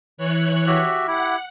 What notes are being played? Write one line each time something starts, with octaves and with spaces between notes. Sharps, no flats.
E3 C#5 F#6
F#4 G4 E5
E4 G4 F#5